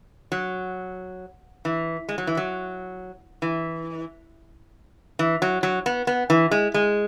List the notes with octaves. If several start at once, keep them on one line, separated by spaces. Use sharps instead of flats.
F#3
E3
G#3
F#3
E3
F#3
E3
E3
F#3
F#3
B3
B3
E3
G#3
G#3